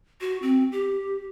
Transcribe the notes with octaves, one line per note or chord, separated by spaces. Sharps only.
F#4
C4
G4